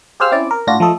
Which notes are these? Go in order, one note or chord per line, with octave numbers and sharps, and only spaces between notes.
G4 G#4 C5 F5 E6 F6
C4 C#4 E4 D5
A#4
A2 D4 F4 F#4 A#6
F3 A3 A4 D#5